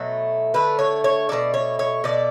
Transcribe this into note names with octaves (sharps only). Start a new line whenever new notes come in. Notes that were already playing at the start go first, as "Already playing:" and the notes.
Already playing: B2 F#3 A3
D3 A3 B4
C#5
C#5
B2 F#3 A3 D5
C#5
C#5
B2 A3 D5